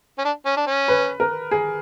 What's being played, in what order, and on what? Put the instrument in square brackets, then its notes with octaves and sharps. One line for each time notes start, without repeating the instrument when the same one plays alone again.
[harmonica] C#4
D4
C#4
D4
C#4
[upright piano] B4
A#4
G#4